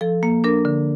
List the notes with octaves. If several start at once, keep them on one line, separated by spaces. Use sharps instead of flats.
F3 A4
A#3
D4 A#4
D3